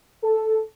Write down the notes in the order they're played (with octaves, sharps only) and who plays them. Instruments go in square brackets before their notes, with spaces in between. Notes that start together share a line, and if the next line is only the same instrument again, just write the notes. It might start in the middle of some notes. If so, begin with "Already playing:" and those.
[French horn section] A4